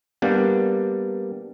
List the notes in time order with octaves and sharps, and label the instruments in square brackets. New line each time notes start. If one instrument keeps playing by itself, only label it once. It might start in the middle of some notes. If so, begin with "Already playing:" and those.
[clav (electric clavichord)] G3 A#3 B3 D4